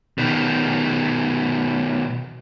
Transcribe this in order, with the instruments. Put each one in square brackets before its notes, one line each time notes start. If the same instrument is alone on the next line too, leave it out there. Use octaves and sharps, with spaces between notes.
[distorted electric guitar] B2 D#3